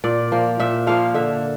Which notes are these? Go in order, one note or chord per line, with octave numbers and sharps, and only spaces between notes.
A#2 D5
F3 A#3
A#2 E5
F3 A#3 F5
D3 E5